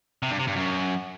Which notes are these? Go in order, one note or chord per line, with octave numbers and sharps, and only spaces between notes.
C3
G2
C3
G2
F#2